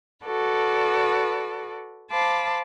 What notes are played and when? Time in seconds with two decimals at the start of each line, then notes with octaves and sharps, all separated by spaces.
0.25 F#4 A4 B4 D5
2.11 C5 F5 A5 B5 D6